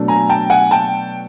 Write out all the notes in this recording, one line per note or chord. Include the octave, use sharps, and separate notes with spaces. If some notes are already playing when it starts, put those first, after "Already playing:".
Already playing: B2 F#3 A3 D4
G#5 A#5
G5 A5
F#5 G#5
G5 A5